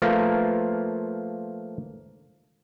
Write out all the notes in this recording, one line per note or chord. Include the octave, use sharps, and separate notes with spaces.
F3 A3 A#3 F4 A#4 B4